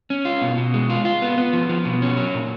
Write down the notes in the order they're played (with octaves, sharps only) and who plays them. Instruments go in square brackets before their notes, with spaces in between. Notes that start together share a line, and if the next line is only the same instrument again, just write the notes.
[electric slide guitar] C#4
F4
B2
B2
G#3
F4
F4
B3
B3
F3
F3
B2
C#4
F#3
A#2